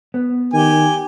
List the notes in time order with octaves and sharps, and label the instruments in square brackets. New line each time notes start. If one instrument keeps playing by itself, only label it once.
[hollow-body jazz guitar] B3
[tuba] D#3 [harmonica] G4 G#5